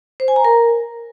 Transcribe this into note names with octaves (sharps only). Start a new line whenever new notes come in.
C5
G#5
A#5
A#4